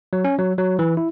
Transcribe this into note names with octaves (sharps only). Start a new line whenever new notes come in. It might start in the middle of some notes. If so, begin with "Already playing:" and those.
F#3
C#4
F#3
F#3
E3
E4